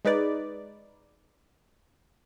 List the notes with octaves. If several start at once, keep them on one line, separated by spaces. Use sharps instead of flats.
G#3 D#4 B4 D5